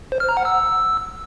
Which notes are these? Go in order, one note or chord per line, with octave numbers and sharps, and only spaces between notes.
C5
F6
A#5
F#5
E6